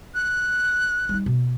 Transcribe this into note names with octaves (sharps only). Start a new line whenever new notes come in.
F#6
G3 D#4
B2